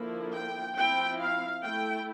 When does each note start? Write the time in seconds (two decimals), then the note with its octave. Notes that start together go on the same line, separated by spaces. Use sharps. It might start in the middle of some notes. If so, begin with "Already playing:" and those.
Already playing: D3 F3 A#3 E4
0.33 G5
0.76 F3 C4 E4 G5
1.19 F5
1.62 A3 E4 G5